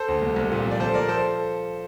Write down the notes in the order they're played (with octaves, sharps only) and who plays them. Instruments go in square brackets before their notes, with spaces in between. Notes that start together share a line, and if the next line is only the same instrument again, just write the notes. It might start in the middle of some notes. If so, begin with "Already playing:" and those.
Already playing: [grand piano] A4 C5
D2
C2
C2
A#2
F3
D5
F3 A4 C5
F3 A#4 D5
A4 C5